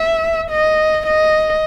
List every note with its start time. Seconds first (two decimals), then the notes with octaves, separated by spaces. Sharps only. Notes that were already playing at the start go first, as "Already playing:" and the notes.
Already playing: E5
0.51 D#5
1.06 D#5